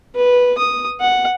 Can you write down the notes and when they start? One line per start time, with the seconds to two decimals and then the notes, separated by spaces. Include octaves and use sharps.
0.15 B4
0.58 D#6
1.01 F#5